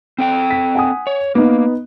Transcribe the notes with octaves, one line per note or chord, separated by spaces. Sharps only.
C4 A4 G5
B6
F#5 G#5 D#6
C#5
A#3 B3 D#4